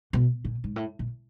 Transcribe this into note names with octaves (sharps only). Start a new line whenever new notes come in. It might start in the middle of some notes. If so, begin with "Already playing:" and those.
B2
A#2
G#2
A2
A#2